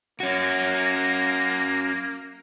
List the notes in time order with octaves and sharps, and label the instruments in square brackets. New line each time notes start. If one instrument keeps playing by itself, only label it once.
[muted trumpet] A#3 [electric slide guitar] C#4 F#4